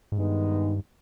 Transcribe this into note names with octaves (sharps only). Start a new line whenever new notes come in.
G#2
G2 D#3 G#3 B3 D#4